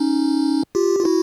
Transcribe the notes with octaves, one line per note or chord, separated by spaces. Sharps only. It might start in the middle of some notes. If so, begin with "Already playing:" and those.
Already playing: C#4 D#4
F4 G4
F4
E4 F#4